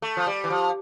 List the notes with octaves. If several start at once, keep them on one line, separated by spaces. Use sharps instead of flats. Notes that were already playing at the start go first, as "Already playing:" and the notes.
A3
F3
G3
E3
F3